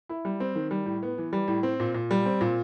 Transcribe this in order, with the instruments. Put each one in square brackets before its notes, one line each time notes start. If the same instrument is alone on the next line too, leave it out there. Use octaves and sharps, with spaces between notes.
[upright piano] E4
G3
C4
D#3
G3
A2
B3
E3
G3
A2
C4
A#2
A#2
G3
C4
A#2